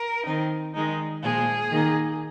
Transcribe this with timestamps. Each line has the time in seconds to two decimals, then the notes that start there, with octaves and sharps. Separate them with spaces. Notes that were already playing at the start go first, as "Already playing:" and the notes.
Already playing: A#4
0.26 D#3 C4 D#4
0.75 D#3 G#3 D#4
1.23 A#2 F3 G#3 G#4
1.71 D#3 A#3 D#4